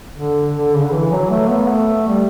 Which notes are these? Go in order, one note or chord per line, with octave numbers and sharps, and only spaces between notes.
D3
D3
C#3
D3
E3
F#3
A3
B3
A3
G3